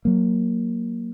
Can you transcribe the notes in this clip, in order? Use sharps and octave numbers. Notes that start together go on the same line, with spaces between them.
F#3 A#3